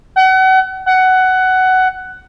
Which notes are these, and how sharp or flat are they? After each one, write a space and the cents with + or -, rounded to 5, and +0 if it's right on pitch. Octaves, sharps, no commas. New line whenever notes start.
F#5 +35
F#5 +15